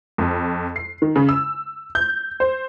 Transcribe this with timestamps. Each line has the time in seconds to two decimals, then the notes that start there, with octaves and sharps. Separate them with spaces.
0.18 F2
0.76 C7
1.02 D#3
1.16 C#3
1.29 E6
1.95 G6
2.40 C5